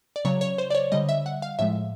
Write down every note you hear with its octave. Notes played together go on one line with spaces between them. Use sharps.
D5
C#3 F#3 C#5
C#5
C5
D5
C#5
D3 G3 D#5
E5
F#5
F5
A2 F3 G#3 E5